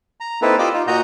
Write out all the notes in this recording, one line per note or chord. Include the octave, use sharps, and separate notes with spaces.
A#5
A#3 C4 D#4 E4 A4 B4
F4 G4 D5 D#5 D6 E6
D#4 F4
A#2 F#4 D#5 A#5 G6